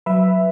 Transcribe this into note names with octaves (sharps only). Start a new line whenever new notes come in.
F#3 B4 E5